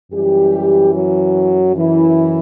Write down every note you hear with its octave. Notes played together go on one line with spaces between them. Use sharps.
F#2 E3 G3 G4
F#3 F#4
E3 E4